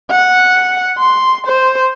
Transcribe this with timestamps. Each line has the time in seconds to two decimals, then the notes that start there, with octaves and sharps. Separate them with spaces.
0.11 F#5
0.99 C6
1.46 C5